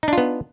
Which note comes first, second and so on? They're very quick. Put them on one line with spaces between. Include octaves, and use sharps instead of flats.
D#4 D4 F4 B3